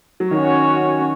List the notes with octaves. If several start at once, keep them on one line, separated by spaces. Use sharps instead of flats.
F#3
D#3 C#4 F#4 C#5